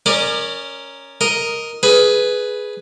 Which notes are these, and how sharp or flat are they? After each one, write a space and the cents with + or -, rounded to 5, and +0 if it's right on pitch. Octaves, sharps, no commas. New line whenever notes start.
C#4 +0 A#4 +0 D5 +35
A#4 +0 D#5 +0
G#4 +10 B4 +0